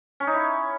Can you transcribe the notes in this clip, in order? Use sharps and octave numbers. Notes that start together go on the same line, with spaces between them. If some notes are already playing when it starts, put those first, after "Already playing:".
C#4
D#4
E4